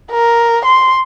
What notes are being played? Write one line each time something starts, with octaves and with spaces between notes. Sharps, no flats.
A#4
C6